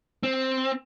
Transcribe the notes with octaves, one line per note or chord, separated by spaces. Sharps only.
C4